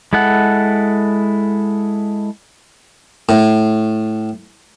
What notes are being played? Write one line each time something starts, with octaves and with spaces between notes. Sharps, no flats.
G#3 E4 A4 F#5
A2